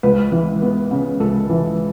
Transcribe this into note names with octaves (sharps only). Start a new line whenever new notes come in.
C#2 B4
E3
B3
C#3
C#2 A4
E3